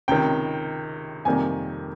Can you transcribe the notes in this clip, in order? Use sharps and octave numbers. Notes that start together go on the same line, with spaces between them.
C#2 C3 D#3 G5
F2 C3 D#3 G3 A#3 G#5